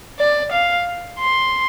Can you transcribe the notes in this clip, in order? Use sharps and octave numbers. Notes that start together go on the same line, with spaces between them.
D5
F5
C6